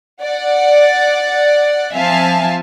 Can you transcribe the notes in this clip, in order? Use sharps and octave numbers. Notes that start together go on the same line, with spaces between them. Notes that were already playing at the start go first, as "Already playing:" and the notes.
D5 F#5
F3 C4 E5 F5 G#5 A5